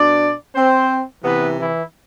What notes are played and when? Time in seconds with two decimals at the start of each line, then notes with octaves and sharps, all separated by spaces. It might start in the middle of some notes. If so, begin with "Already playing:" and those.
Already playing: B2 D4 D5
0.55 C4 C5
1.24 C3 E3 B3 B4
1.59 E3 E4